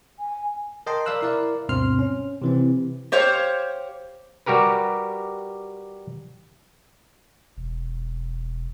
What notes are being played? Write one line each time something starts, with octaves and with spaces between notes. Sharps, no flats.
G#5
A#4 D#5 G5 A5 C6
A#4 D5 F5 B5 E6 F#6
E4 A#4 D5 F5
D2 G2 B2 C4 C6 F6
C#4
C3 E3 C4
G4 C5 C#5 F5
G3 F#4 G4 A#4 B4
E1